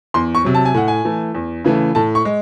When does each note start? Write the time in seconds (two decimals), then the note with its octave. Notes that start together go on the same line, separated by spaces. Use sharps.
0.14 E2 C6
0.35 C#6
0.44 C3 F#3
0.55 A5
0.65 G#5
0.74 A2 F#5
0.88 G#5
1.05 E3 A3
1.35 E2
1.64 C#3 E3 A3
1.95 A2 A5
2.15 C#6
2.25 G#3